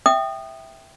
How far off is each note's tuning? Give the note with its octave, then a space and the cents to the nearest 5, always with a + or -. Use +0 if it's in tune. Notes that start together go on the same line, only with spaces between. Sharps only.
E5 +0 G5 +0 D#6 -20